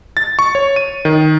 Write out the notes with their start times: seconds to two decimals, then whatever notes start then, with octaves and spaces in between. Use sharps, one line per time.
0.17 A6
0.39 C#6
0.55 C#5
0.76 D#7
1.05 D#3